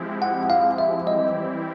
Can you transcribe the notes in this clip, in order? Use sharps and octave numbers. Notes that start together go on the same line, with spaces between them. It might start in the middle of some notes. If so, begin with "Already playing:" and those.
Already playing: F3 G#3 C4 E4 G4
F#5
F5
E5
E3 G3 C4 E4 G4 D#5